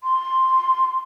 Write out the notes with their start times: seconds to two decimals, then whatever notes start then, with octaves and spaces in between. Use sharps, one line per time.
0.03 C6